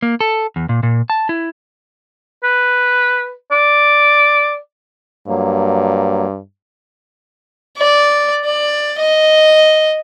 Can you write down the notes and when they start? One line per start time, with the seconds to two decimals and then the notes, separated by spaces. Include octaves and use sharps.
0.02 A#3
0.21 A4
0.56 E2
0.69 A#2
0.83 A#2
1.10 A5
1.29 E4
2.43 B4
3.51 D5
5.28 G2 F#3 A#3
7.77 D5
8.44 D5
8.98 D#5